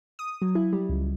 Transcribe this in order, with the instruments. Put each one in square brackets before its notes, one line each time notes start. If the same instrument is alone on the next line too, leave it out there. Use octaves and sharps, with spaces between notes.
[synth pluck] D#6
F#3
E4
G3
C#2